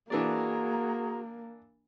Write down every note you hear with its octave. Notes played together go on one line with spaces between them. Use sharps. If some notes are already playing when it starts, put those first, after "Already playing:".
E3 A#3 D4 F#4 G#4 D5 A#5